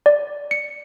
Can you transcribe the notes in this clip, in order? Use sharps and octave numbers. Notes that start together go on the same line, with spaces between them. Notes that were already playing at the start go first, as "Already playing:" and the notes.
D5
C#7